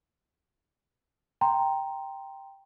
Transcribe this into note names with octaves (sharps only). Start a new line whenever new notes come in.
G5 A#5 C6